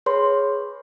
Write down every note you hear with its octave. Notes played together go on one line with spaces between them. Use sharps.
G#4 B4 C#5 B5 C6